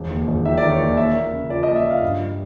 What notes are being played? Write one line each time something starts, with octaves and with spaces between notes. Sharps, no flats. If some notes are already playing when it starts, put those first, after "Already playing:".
Already playing: E1
D#2
E1
D#3 E5
D5
D#3
C#5
D#2
A#3 E5
A#3
C#3
F3 D5
A#3 D#5
E5
F3
F5
G2
G3